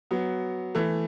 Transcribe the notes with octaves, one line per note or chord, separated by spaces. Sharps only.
F#3 B3
E3 A3